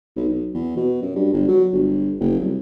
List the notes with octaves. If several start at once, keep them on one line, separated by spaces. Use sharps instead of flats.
B1
B1
E2
B2
F#2
G2
G1
F#3
G1
F#1
C2